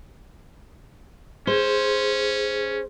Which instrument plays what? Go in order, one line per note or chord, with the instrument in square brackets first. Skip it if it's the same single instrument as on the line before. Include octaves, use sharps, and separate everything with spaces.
[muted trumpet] C#4 [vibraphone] G#4 [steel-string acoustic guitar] C5